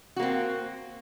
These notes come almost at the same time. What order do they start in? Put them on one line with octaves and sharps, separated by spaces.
F#4 A#3 C4